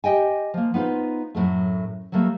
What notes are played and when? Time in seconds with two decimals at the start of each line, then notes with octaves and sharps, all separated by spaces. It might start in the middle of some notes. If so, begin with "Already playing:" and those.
0.04 G4 D#5 G5 G#5
0.54 F3 A#3
0.74 B3 D#4 F4 B4 C5
1.35 F#2 A2 F#3 A3
2.12 F#3 G3 A3 A#3